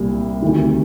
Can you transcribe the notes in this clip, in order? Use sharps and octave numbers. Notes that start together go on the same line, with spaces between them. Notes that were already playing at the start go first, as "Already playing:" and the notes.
Already playing: C2 A#2 G3
D2 C3 D#3